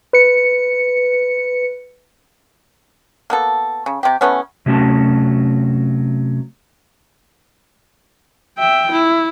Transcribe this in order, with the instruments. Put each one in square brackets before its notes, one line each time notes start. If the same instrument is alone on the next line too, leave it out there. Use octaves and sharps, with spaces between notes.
[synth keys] B4 C#7
[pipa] A#3 B3 A4
C#3
C3 G4
E3 A3 B3 C#4
[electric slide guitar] C3 F#3 A3 C#4 F#4 A5
[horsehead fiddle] E5 G5
E4